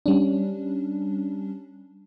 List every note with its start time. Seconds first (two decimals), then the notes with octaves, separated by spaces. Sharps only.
0.06 G3 C#4 D4